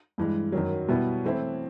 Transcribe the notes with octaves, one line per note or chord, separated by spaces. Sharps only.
G2 E3 G#3
F#2 D#3 F#3
B2 G3 B3 E4
E3 A3 C4 E4